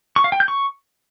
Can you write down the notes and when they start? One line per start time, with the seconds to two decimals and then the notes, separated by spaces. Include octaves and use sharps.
0.16 C#6
0.24 F5
0.32 G5
0.40 G6
0.48 C#6